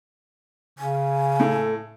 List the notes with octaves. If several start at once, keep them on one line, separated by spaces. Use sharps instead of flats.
C#3 G#5
A2 A4